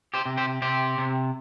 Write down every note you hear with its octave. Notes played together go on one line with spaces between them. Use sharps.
G4 C5
C3
G4 C5
C3 G4 C5
C3